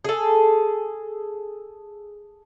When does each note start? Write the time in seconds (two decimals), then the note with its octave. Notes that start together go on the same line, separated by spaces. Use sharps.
0.05 G#4 A4